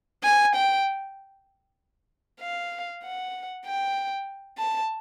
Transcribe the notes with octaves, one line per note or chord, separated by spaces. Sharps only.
G#5
G5
F5
F#5
G5
A5